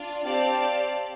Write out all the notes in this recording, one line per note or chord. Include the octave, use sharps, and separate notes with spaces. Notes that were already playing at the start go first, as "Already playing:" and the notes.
Already playing: D4 F4
C4 G4 D5 F5 A5